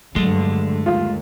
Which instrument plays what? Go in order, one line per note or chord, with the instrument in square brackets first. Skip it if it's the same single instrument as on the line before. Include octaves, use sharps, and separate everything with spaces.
[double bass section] G2 D3 [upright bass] F#3 [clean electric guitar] G#3 A3
[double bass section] D#2 [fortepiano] F4